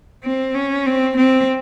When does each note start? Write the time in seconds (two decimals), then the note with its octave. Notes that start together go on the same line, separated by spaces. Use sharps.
0.24 C4
0.55 C#4
0.86 C4
1.17 C4